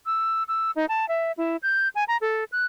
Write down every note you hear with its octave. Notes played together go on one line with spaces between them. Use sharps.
E6
E6
D#4
A5
E5
E4
G6
G#5
A#5
A4
F#6